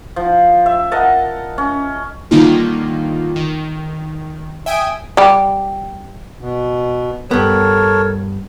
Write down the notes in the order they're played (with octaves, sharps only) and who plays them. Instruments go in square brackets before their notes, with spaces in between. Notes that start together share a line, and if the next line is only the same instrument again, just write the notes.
[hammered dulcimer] F3
E5
A#4 D#5 F#5 A5
C#4
[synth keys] D3 D#3 G3 A#3 D#4 F4
D#3
E5 G5 G#5 D#6 D7
[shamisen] G3 G4
[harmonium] B2
[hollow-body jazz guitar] G2 B3 [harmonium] A4 A#4 C#5